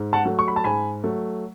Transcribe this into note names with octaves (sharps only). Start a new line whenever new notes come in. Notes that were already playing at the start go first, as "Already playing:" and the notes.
Already playing: G#2
F#5 A5
F#3 A3
C#6
B5
A5
G#2 G#5 B5
F#3 A3